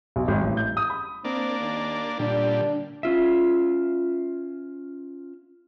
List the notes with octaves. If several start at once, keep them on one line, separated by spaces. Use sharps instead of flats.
B1
G#1
A1
G6
D#6
B5
A#3 C4 D4
D#2
A#2 D3 G3 D4
C#4 F4 E5